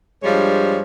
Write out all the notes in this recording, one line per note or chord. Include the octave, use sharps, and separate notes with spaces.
G2 F3 G3 G#3 C#5